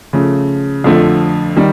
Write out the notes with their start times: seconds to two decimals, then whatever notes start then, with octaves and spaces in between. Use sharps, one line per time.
0.13 C#3 F3 A3
0.84 F2 D3 F3 A3
1.57 D#3 G3